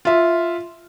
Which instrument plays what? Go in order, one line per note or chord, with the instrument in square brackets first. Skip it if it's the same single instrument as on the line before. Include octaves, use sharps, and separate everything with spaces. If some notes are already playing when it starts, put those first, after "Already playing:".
[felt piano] F4 E5